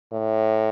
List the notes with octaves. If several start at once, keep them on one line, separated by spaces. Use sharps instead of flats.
A2